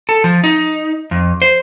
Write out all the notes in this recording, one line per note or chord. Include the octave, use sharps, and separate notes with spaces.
A4
F3
D#4
F2
C5